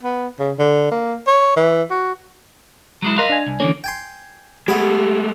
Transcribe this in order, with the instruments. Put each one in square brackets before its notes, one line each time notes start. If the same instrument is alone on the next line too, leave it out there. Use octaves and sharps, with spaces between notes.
[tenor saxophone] B3
C#3
D3
A#3
C#5
E3
F#4
[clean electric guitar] F#3 G#3 E4
[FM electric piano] A#4 C6 F#6 [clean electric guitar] D#5 F5
[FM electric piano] D4 G#5
[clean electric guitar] C2
[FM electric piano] D3 C#4 [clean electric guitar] E3 G#3 A#3
[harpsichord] G5 G#5 C6
[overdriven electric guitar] G#3 A3 [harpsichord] B3 G#4 B5 [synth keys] G4